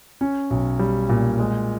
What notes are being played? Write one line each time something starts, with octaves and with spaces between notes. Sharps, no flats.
C#4
B1
G3
A#2
G#3